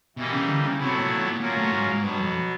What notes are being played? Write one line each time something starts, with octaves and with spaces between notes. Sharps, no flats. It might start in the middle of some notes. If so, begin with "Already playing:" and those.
B2 E3 G3 A#3 D#4
C#3
D3
C#3
A2 C3 F#3 B3 E4
A#2
A#2
A#2 F#3 A#3 C#4 F4 A#4
A2
G#2
G#2
G2 B2 F#3 B3
F2